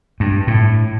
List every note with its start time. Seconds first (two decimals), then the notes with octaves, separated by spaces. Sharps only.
0.20 G2
0.47 A2